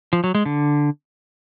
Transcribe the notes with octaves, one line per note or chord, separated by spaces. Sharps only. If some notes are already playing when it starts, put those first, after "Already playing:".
F3
F#3
G#3
D3